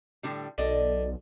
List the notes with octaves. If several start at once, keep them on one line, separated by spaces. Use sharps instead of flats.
A2 D3 G3
B1 D3 D5 D#5